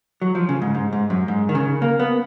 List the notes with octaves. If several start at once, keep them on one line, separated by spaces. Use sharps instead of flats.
F#3
F3
C#3
G#2
G#2
G#2
F#2
G#2
D#3
C#3
A#3
B3